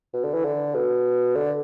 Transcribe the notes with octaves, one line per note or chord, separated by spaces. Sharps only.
B2
D3
E3
D3
B2
D3